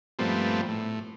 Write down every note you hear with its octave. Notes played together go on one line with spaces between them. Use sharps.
G2 A#2 F3 A3 B3 C4
A2